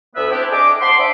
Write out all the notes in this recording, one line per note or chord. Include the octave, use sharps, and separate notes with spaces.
D2 B3 B4 E5
C4 D4 E4 G4
D4 G#4 D#5 E5 D6
C5 F#5 A5 B5 C6
D4 E5 B5 D6